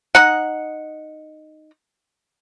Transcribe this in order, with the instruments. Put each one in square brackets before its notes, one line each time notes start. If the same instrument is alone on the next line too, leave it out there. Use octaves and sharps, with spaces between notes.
[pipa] D#4 F#5